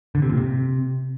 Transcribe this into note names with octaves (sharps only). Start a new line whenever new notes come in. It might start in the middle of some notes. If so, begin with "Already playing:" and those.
D3
C3
A#2
C3